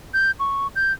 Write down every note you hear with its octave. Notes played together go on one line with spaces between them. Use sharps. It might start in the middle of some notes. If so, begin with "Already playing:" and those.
G6
C#6
G6